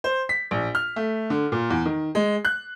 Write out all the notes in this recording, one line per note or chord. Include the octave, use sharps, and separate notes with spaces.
C5
B6
A#1
F6
A3
D3
A#2
E2
D#3
G#3
F#6